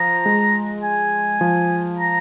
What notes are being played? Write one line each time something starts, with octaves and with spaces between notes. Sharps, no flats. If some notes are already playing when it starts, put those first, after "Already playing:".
Already playing: F3 A#5
G#3
G#5
F3
A#5